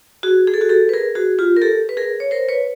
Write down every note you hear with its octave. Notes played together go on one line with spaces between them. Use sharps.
F#4 G#4
G#4
A4
F#4 G#4
G4 A4
B4
G#4 A#4
F#4 G#4
F4 G4
A#4
G4 A4
B4
G#4 A#4
C#5
A#4 C5
B4 C#5